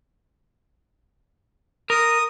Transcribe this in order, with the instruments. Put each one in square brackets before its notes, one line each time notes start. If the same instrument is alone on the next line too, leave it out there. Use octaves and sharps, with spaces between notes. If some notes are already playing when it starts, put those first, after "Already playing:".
[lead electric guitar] A#4 [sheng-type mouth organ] D#6